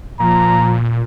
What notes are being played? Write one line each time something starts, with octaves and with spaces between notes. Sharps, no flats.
A#2 F3 A#5